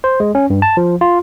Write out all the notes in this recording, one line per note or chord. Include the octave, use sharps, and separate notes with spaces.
C5
G#3
C#4
G2
A5
F3
F4